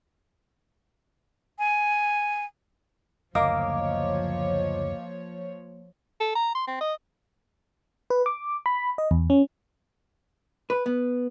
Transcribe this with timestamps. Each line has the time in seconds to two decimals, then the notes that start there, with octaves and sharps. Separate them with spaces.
1.59 G#5
3.35 F#1 D2 F3 A#3 C#5 D#5 F5 D6
6.20 A4
6.35 A#5
6.55 C6
6.67 C4
6.81 D#5
8.10 B4
8.26 D6
8.66 B5
8.98 D#5
9.11 E2
9.30 C#4
10.70 B4
10.86 B3